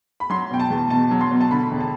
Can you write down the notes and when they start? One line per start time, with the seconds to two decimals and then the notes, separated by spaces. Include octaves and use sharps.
0.20 B5
0.30 F#3 C6
0.51 B2 G5
0.60 A5
0.70 E2
0.90 B2 A5
1.11 F#3
1.21 C6
1.31 B2
1.41 A5
1.51 D3 B5
1.71 E1
1.80 A5